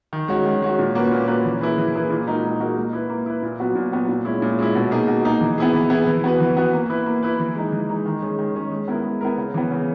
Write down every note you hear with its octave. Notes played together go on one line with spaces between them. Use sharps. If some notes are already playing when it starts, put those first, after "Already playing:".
D#3
G#3 C#4 F#4
D#3
G#3 C#4 F#4
A#2
A#3 C#4 F#4 B4
A#2
A#3 C#4 F#4 B4
E3
A#3 E4 G#4 B4
E3
A#3 E4 G#4 B4
A#2
G#3 D#4 F#4 A#4
A#2
G#3 D#4 F#4 A#4
A#3
E4 B4
A#3
E4 B4
A#2
F#3 B3 F#4
A#2
F#3 B3 F#4
A#2
G#3 C#4 E4
A#2
G#3 C#4 E4
B2
A#3 D#4 G#4
B2
A#3 D#4 G#4
E3
B3 E4 G#4
E3
B3 E4 G#4
E3
B3 F#4 B4
E3
B3 F#4 B4
A#3
E4 B4
A#3
E4 B4
E3
G#3 D#4
E3
G#3 D#4
D#3
G#3 C#4 G#4
D#3
G#3 C#4 G#4
G#3
B3 E4 A#4
G#3
B3 E4 A#4
C#3
E3 B3
C#3